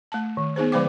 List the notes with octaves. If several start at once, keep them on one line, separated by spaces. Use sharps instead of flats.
A3 A5
D#3
B3 D#4 G#4 C5
D3 F3 G#3 C5 G5 D6